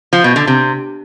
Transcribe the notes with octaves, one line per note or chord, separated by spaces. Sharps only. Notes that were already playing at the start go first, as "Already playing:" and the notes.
F3
B2
D3
C3